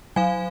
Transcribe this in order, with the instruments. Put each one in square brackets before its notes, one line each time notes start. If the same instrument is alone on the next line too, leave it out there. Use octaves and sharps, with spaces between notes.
[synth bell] F#3 F5 G#5